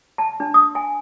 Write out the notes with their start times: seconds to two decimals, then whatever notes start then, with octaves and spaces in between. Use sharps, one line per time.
0.18 A5
0.40 D4
0.54 D#6
0.75 G#5